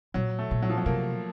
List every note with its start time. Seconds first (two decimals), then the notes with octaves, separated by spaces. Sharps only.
0.14 A#2 F#3
0.39 A3
0.51 A#2
0.63 F#3
0.70 F3
0.78 F#3
0.86 C3 A#3